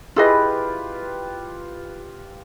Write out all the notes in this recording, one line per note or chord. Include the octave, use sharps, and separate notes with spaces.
E4 F4 G4 G#4 B4 D#5